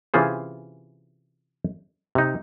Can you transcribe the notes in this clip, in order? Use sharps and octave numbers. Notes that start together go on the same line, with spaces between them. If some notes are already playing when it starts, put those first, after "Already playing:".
C3 E3 C#4 F4 G#4 C5
C3 D#4